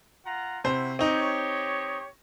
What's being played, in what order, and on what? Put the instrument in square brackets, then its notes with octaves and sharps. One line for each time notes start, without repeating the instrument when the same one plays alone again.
[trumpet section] F4 F#5 A#5
[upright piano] C3 C5 [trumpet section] E4 F#4
[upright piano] C4 D#4 [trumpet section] G4 C#5